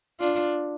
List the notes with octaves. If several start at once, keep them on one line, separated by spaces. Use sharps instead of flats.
D4 F4